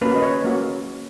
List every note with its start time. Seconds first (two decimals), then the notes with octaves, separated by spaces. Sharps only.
0.01 A#3 C#4 F#4 B4
0.16 D#5
0.22 C#5
0.44 A#3 C#4 F#4